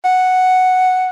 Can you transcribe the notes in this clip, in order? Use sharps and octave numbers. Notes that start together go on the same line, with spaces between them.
F#5